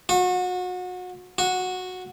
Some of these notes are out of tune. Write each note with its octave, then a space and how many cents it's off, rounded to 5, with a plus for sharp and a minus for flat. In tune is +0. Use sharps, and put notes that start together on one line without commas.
F#4 -30
F#4 -10